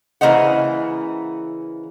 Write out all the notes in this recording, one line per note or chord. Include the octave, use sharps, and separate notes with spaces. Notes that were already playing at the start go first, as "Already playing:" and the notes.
C#3 E3 A#3 C5 D#5 F#5